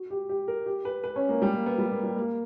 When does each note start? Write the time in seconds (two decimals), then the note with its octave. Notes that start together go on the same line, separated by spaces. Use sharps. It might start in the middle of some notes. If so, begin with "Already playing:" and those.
Already playing: F#4
0.10 G4
0.29 G4
0.48 A#4
0.66 G4
0.85 B4
1.04 B4
1.16 C#4
1.29 A#3
1.42 G3
1.53 A#3
1.66 B3
1.78 G3
1.92 A#3
2.03 G3
2.16 A#3